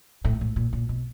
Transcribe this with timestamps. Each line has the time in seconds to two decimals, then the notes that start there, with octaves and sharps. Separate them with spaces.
0.25 A2
0.41 A2
0.56 A#2
0.73 A#2
0.89 B2